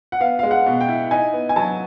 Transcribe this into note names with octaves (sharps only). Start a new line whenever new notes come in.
F#5
B3 F5
G#3 F5
F#5
B2
G5
E4
D#4 G#5
B3
G#5
F#3 A5